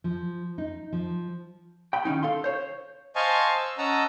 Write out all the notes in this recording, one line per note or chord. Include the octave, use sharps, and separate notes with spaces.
F3
D#4
F3
G5 B5
D#3 C#4 D#4
A4 F5 C6
C5 C#5
C5 D#5 F5 G#5 A5 C#6
E6
C#4 D#5 F#5 A5 A#5 E6